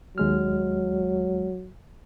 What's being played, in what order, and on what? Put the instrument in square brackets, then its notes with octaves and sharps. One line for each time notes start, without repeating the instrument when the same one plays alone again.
[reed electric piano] D#2 G#3 F6 [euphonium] F#3